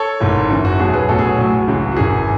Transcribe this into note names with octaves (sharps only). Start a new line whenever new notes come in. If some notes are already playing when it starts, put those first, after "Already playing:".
Already playing: A4 C#5
G#1 G#2 E3
F#1 F#2 E3
F#4
E2 B2 F#3 G#4
G#4 B4
A1 A2 F#3 F#4 A4
G#4
F#4
A1 A2 F#3
C#2 C#3 E3
F#4
G#1 F#2 E3 G#4